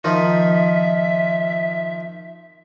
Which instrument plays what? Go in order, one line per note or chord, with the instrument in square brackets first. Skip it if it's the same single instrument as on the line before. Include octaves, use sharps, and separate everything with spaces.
[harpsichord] D#3 F3 D#4 [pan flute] E5